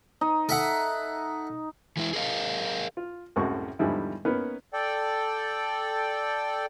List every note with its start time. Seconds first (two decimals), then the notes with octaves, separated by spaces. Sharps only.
0.21 D#4
0.49 A4 E5 F#5
1.97 E3 G#3 E4
2.13 G#4 A#4 D#5 F5
2.97 F4
3.36 C2 F#2 A2 G#3 F#4 C#6
3.79 E2 G#2 D3 F3 G3 E4
4.25 A#3 B3 C#4 D#4 A#4 B4
4.73 A4 D5 G5